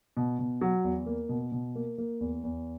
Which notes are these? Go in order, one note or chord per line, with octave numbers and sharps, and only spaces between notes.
B2
B2
F#3
E2
A#3
B2
B2
A#3
A#3
E2
E2